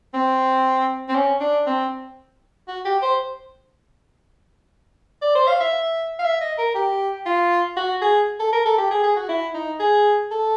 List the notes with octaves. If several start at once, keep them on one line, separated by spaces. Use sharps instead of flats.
C4
C4
C#4
D4
C4
F#4
G4
C5
D5
C5
F5
E5
F5
E5
D#5
A#4
G4
F4
F#4
G#4
A4
A#4
A4
G4
G#4
G#4
F#4
E4
D#4
G#4
A4